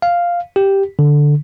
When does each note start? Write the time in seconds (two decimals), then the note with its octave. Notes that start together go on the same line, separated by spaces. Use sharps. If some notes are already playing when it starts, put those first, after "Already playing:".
0.02 F5
0.56 G4
0.99 D3